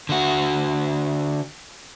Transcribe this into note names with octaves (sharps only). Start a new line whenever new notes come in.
D3 F#4